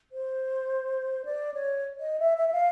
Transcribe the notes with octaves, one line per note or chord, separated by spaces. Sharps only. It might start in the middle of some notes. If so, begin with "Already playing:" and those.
C5
D5
C#5
D#5
E5
E5
E5
F5